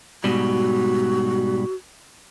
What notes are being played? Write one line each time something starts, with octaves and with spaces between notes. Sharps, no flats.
G#2 B2 G3 F#4